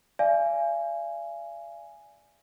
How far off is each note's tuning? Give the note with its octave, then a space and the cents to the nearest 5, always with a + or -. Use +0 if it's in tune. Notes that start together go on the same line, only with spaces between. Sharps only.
D5 +0 F5 -45 G#5 +0